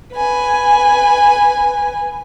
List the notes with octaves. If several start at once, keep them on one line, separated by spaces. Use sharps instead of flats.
B4 G#5